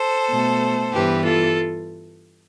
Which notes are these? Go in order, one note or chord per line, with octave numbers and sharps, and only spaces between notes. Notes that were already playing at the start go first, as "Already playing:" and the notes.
Already playing: A4 C5
B2 A3
G2 E3 G3 B3 G4 B4
F4 A4